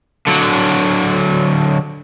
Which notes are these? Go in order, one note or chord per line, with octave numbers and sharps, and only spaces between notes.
D3 F#3